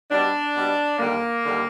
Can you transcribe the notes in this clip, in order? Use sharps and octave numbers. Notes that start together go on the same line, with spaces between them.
B2 G3 D4
B2 G3
D#2 D3 G3 A#3
D#2 D3 G3